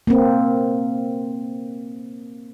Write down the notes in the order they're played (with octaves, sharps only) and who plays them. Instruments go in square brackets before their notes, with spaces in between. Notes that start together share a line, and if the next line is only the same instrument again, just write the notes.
[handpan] A#3 C4